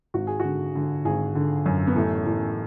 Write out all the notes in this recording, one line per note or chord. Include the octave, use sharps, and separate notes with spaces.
G#1 F#4
G#4
D3 F#4
D3
G#1 G#4
D3
F#2
B3
A1 A3
A1 A3